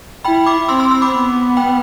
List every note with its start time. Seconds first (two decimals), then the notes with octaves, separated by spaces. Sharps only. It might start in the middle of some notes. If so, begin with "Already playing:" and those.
0.25 E4 G5 B5
0.46 B5 D6
0.69 C4 C6 E6
0.80 C6 E6
0.91 C6 E6
1.02 B5 D6
1.13 B3
1.57 G5 B5